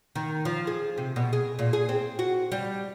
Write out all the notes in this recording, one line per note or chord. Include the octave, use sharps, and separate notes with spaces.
D#3
F3
G#4
C3
B2
G#4
A#2
G#4
C4
F#4
G3